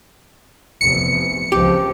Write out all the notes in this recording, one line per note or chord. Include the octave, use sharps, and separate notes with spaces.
F1 E2 C#7
C#2 F3 C4 G4